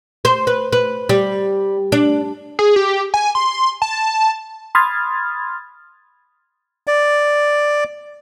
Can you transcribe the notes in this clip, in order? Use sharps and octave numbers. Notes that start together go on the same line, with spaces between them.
C5
B4
B4
G3
D4
G#4
G4
G#5
C6
A5
B5 C6 D#6 F6 G#6 A6
D5